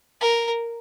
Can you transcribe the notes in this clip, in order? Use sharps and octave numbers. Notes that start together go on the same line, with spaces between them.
A#4